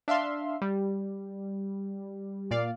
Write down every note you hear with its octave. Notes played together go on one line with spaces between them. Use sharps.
D4 E5 F5 C6
G3
A#2 D5 F5